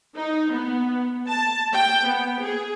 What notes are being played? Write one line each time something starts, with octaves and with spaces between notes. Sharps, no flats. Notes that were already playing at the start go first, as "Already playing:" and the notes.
D#4
B3
A5
G5
B3
G#4